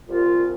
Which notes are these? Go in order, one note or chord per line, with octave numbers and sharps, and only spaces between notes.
C2 A#2 F4